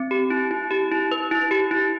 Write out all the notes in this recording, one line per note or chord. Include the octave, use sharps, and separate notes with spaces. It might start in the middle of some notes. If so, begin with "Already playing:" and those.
Already playing: C4
G4
E4
E4
G4
E4
B4
E4
G4
E4